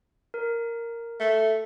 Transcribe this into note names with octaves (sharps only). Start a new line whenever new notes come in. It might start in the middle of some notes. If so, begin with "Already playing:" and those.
A#4
A3